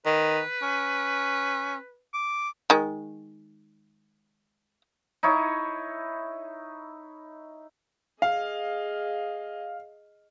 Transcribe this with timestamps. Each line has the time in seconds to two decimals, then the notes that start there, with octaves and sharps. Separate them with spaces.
0.06 D#3 B4
0.62 C#4
2.14 D6
2.70 D#3 G#3
5.23 D#4 E4 C#5
8.22 G#4 D#5 F5